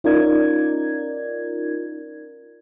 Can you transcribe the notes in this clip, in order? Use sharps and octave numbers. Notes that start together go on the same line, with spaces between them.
C#4 D#4 F4 A#4 D5 G#6